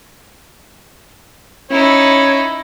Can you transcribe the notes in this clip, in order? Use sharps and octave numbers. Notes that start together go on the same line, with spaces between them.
C#4 D#4 E4 C#5